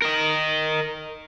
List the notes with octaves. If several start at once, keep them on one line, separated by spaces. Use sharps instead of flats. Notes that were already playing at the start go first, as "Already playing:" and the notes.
A#4 D#5